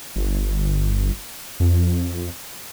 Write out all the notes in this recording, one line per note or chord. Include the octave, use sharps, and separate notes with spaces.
G1
F2